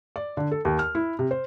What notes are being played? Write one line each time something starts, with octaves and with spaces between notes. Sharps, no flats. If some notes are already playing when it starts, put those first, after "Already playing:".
D5
D3
A4
D#2
F6
E4
C3
C5